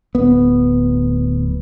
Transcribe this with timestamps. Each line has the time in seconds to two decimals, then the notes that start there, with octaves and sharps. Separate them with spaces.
0.15 D1 B3